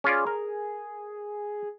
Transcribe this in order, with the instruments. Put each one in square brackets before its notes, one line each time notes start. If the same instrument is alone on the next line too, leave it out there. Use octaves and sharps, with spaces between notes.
[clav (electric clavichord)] C#4 F4 D5 [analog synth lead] G#4
[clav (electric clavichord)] A#4